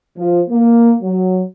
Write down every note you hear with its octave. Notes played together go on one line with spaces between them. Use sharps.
F3
A#3
F#3